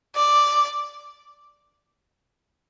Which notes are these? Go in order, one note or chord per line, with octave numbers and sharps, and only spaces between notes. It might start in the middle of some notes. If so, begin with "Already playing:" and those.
D5